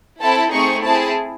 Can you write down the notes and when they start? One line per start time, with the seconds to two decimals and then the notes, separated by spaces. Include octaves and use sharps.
0.21 C4 E4 A4 A5
0.52 A3 C4 D#4 G#4 C#6
0.83 C4 E4 G#4 A5